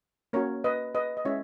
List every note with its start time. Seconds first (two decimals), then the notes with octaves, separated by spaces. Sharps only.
0.33 A#3 C#4 F#4 A#4 C#5
0.64 B4 D#5
0.95 B4 D#5
1.17 D#5
1.25 G#3 C#4 E4 C#5 E5